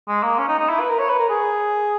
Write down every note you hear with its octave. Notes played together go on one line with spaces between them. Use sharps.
G#3
A#3
C#4
D#4
D#4
E4
B4
A#4
C#5
B4
A#4
G#4